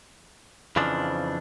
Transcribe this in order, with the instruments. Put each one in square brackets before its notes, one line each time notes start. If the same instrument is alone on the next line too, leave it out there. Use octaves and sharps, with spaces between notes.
[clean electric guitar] F2 C#3 E3 F3 D4